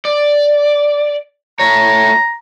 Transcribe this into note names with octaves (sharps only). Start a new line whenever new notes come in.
D5
A3 C#5 A#5